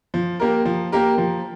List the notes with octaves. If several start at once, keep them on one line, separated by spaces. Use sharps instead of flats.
F3
A#3 G4 A#4
F3
A#3 G4 A#4
F3